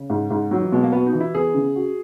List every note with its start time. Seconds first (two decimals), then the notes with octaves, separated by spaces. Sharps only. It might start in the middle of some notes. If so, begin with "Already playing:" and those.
Already playing: C#3
0.10 G#2
0.30 G#2
0.51 D#3 F#3
0.61 E3
0.72 B2 G#3
0.83 A#3
0.92 B3 F#4
1.06 D#4
1.13 E3
1.20 E4
1.34 B3 G#4
1.55 C#3
1.75 F#4